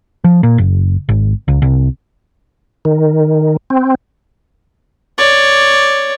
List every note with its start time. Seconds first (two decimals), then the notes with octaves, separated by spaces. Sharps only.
0.24 F3
0.43 A#2
0.58 F#1
1.09 G#1
1.48 C#2
1.62 C2
2.85 D#3
3.70 C4
5.18 C#5 D5